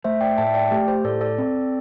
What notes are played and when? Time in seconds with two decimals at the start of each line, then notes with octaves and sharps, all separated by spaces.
0.04 A3 C5 E5
0.21 D5 G5
0.38 A2 E5 A5
0.54 D5 G5
0.71 A3 G4
0.88 G4 C5
1.04 A2 A4 D5
1.21 A4 D5
1.38 C4